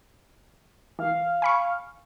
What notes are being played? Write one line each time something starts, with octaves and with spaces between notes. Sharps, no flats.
E3 F5
G#5 B5 C#6